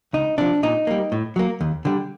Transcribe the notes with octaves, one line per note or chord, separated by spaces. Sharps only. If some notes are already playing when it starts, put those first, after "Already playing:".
C#2 D#4
C3 F3 D4
A#2 D#4
G3 A#3
A2
F#3 A#3
D#2
D3 G3